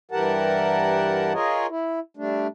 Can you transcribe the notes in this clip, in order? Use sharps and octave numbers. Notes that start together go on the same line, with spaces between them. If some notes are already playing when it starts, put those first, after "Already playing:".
G2 E3 G4 A#4 F#5 A5
F4 G#4 A#4 C#5 D#5
E4
G3 A3 D4